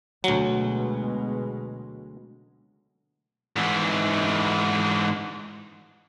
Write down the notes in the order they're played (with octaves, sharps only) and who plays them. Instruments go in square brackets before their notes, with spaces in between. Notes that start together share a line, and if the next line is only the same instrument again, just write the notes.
[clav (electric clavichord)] D2 F#3 [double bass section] B2 G#3
[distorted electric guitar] G#2 E3